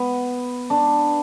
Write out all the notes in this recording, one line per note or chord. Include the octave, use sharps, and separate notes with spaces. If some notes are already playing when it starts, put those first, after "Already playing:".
Already playing: B3
D4